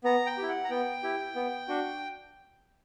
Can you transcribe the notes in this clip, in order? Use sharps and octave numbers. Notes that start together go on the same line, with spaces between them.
B3 A#5
G5
G4
E4
F#5
A#5
B3 G5
E4 G4
B3
D4 F#4